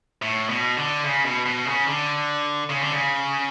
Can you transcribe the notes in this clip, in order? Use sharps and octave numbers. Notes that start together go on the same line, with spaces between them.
A2
B2
D3
C#3
B2
B2
C#3
D3
C#3
D3
C#3